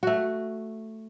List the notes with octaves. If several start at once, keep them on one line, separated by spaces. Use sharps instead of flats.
A3 F#4